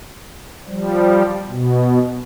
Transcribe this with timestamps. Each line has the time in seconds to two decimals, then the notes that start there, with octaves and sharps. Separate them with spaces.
0.68 F3 G3
1.48 B2